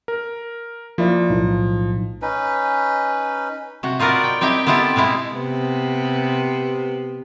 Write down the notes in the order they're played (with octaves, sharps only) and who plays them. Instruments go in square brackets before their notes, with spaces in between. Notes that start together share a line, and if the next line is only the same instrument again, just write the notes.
[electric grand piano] A#4
[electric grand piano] F3 [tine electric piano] A#3 E4 D5
[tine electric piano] B1 A2 D#4
[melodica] C#4 D#4 B4
[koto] C3 F#4
D#4 F4 F#4 A#4 B4 D5
G5
C4 D#4 E4 G4 G5
B3 C4 E4 F4 G4 A4
B2 G#3 B3 E4
[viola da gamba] C3 B3